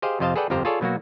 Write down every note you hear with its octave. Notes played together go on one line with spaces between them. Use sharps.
G4 G#4 C5 D#5 F5
F2 C3 C5 D#5 F5 A5
G#4 A4 B4 D5 F#5 G5
G1 F2 F3 G4 C5 A#5
F4 G#4 A4 C#5 D5
B2 F#3 A#3 F#4